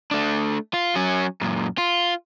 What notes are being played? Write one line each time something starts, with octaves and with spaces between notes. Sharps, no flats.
A3 D4
F4
F#3 C#4
F#2 A#2
F4